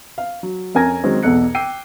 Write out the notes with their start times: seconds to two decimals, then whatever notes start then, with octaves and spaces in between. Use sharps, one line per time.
0.18 F5
0.43 F#3
0.75 F2 C#4 A#4 G#5 G#6 A#6
1.04 D#3 F#3 G#3 C4 C#4
1.23 B1 E2 A4 D#5 F#6 C#7
1.55 G5 D6 E6 C7 D#7